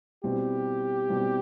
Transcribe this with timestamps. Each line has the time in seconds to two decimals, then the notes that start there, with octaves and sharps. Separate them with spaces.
0.24 B2 G3 C4 E4 G4
1.09 B2 G3 C4 E4